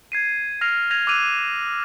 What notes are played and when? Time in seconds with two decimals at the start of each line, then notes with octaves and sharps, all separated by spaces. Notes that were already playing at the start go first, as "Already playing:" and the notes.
0.12 G#6 C7 D#7
0.61 F6 A#6 C7 F7
0.90 G#6 A#6 D#7 F7
1.07 D6 E6 F#6 G#6 D#7 F7